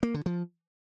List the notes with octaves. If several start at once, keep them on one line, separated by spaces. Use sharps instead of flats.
A#3
D3
F3